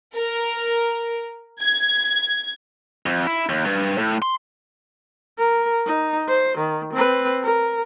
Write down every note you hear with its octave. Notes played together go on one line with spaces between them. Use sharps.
A#4
G#6
F2
E4
D#2
G2
A2
C6
A#4
D#4
C5
D#3
C4 B4
A#4